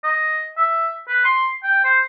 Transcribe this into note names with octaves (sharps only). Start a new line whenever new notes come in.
D#5
E5
B4
C6
G5
C5